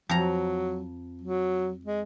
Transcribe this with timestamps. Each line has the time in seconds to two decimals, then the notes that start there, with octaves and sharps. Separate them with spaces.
0.09 F2 F#3 A#5
1.21 F#3
1.85 G#3